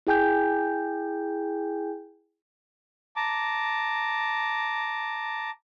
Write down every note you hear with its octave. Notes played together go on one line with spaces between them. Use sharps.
E4 G#4 G5 G#5 G6
A5 A#5 D6